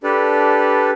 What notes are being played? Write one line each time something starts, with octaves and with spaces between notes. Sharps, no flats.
D4 G4 A4 B4 D5